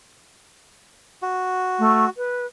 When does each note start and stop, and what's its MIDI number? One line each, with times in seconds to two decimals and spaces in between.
1.22 2.10 66
1.79 2.05 57
2.17 2.46 71